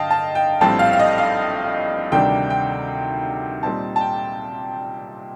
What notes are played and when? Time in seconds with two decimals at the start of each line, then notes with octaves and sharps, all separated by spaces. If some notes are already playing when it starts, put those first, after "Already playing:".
Already playing: G2 D3 D#5 F5 G5 A5
0.11 A5
0.35 G5
0.61 A#1 A2 G3 C4 A5
0.79 F5
0.93 F5
0.99 D#5
1.18 F5
2.11 D2 C3 D#3 G3 D4 G5
2.50 G5
3.63 A#2 G3 C4 D#4 A5
3.96 A5
4.01 G5